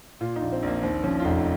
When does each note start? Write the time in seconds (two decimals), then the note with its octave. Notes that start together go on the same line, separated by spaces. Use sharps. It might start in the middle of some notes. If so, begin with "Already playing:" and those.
0.21 A#2 F4
0.36 D#4
0.42 A#1
0.52 C4
0.63 A#1 A#3
0.83 D#2 C4
1.04 F3 C#4
1.20 F4
1.25 F1 D#4